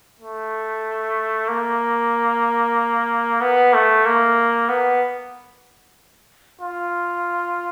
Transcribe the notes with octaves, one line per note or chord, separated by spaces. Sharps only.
A3
A#3
B3
A3
A#3
B3
F4